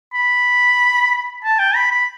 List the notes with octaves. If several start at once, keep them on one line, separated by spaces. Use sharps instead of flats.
B5
A5
G5
B5
B5